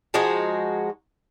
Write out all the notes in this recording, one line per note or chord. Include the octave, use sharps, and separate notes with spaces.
F3 G#3 D#4 F#4